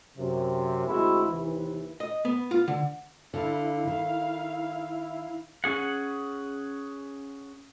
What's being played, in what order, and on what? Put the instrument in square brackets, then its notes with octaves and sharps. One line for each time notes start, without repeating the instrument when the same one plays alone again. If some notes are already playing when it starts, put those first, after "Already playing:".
[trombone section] F#2 C3
D2 G#3 C4 E4 F#4
D#2 C3 E3
[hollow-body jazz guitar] D#5
B3
F4
D3
[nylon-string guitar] D3 [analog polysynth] E4 [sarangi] F5
[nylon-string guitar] D#3
[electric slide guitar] C#4 G#4 F#5